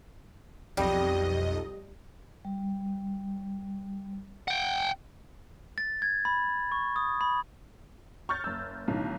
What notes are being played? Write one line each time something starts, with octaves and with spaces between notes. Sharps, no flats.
B1 F2 G3 D#5
G3
F#5 G5
A6
G#6
B5
C#6
D#6
B5
C#6 F6 G6 A6
F#1 E6
B1 A2 D3 D#3